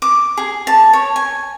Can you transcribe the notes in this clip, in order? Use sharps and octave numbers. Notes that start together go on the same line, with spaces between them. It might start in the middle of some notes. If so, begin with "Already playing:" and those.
D6
G#4
A5
C#5
G#5